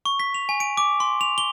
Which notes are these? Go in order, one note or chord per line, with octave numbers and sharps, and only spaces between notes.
C#6
B6
F7
G#5
D7
D6
C6
F7
G7